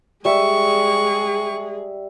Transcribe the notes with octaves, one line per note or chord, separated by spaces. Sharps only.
G3 G#3 G#4 E5 C#6